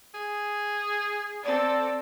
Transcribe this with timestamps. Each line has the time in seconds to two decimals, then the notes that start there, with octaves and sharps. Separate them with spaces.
0.14 G#4
1.44 C4 A4 D5